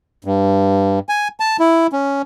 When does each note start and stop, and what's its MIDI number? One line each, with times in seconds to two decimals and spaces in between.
0.25 0.99 43
1.09 1.28 80
1.40 1.57 81
1.59 1.87 64
1.93 2.22 61